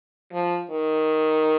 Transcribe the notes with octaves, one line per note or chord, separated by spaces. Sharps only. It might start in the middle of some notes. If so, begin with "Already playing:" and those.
F3
D#3